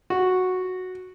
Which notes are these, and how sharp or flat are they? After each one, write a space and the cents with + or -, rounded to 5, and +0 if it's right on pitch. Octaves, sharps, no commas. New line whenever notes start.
F#4 -5